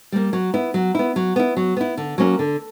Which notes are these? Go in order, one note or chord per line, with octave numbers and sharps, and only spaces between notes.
G3 A#3
F#3
B3 E4
F#3
B3 E4
F#3
B3 E4
F#3
B3 E4
D3
F#3 A#3 C#4
D3